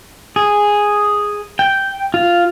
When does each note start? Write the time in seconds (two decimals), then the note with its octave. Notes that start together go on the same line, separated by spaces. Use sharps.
0.36 G#4
1.59 G5
2.14 F4